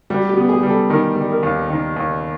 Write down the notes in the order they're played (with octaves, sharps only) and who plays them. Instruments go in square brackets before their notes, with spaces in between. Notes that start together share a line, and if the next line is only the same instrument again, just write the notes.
[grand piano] G3 [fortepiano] F#4
[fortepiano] G4
[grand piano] B3
[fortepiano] G#4
[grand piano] G3
[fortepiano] A4
[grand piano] D#3 [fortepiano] A#4
[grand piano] G3
[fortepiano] A#4
[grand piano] D#2
D#3
D#2